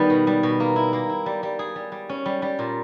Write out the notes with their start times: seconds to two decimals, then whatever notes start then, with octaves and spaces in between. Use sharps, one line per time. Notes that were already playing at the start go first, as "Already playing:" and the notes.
Already playing: D#3 G3 B3
0.10 B2
0.27 G3
0.43 B2
0.60 A#3
0.76 E4
0.93 A#3
1.09 E4
1.26 G3
1.43 G3
1.59 G#4
1.76 G3
1.92 G3
2.09 C#4
2.26 G3
2.42 G3
2.59 A#2